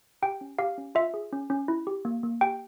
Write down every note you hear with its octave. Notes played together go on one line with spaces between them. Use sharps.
G4 G5
C#4
G4 F5
C#4
F4 E5
G#4
C#4
C#4
E4
G4
A#3
A#3
G4 G5